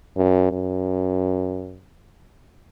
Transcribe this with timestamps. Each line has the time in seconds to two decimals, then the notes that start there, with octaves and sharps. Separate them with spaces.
0.16 F#2
0.52 F#2